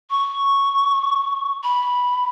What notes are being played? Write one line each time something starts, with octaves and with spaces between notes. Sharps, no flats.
C#6
B5